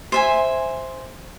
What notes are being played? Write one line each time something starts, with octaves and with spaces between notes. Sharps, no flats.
C5 E5 G#5